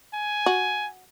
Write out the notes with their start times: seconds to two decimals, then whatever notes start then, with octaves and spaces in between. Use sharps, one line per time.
0.14 G#5
0.46 F#4